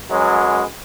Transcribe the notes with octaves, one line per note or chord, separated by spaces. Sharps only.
F#2 F#3 G#3 B4